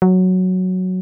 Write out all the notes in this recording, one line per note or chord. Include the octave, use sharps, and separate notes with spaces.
F#3